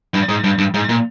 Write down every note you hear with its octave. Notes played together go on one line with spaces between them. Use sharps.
G2
G#2
G2
G2
G#2
A#2